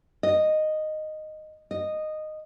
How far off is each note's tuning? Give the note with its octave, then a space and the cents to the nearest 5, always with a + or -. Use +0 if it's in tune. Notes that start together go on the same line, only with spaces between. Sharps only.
D#5 -10
D#5 -10